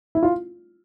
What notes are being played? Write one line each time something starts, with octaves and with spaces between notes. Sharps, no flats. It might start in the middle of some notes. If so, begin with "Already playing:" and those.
E4
F4